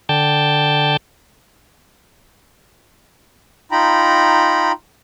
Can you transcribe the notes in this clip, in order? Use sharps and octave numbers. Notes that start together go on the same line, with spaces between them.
D3 G5 A5
D#4 F4 G5 A#5 B5